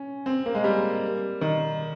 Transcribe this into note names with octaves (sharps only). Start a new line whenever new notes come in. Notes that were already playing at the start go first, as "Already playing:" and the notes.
Already playing: C#4
C4
A#3
G#3
G3
D#3